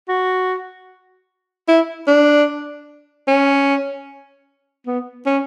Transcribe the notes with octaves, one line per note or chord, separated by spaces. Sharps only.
F#4
E4
D4
C#4
B3
C#4